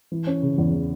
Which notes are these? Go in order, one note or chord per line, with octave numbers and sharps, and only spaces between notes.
E3
C#4
C#3
E2
E3